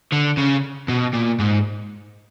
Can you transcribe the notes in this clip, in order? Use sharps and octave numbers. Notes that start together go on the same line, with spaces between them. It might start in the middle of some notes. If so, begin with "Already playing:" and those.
D3
C#3
B2
A#2
G#2